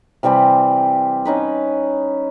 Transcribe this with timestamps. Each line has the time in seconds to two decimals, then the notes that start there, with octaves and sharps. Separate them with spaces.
0.23 C3 E3 G3 C4
1.25 C#4 D#4 B4